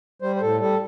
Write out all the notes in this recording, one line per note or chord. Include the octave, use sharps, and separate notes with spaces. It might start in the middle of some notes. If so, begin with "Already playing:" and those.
G3 C5
C5
A2 A4
G3 A4